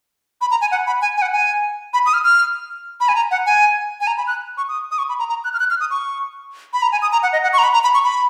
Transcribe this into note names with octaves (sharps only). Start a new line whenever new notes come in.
B5
A#5
G#5
F#5
B5
G#5
G#5
F#5
G#5
B5
D#6
F6
F6
B5
G#5
A#5
F#5
G#5
G#5
A#5
B5
F#6
C#6
D#6
D#6
C#6
B5
A#5
A#5
F#6
F6
F#6
F6
D#6
C#6
B5
A#5
G#5
D#6
A#5
F#5
D#5
F#5
C#6
A#5
B5
A#5
B5
C#6
B5